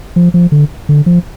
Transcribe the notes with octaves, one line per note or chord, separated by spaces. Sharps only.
F3
F3
D3
D3
F3